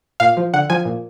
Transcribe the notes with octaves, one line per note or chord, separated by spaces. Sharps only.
A#2 F5
F3
D3 F#5
F3 G#5
A#2